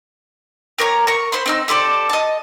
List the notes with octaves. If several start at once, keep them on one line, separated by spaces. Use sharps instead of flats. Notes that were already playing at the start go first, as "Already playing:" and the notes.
G4 A#4 C#5 A#5
A#4 C#6
C5 B5 C6
C4 D#4 E6
G4 A4 C5 D5
D#5 A5